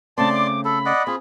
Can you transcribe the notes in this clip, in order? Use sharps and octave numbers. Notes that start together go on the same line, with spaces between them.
C#3 A3 C4 D5 A5 C6
D6
A4 B5
D5 D#5 F#5
C4 F4 G#4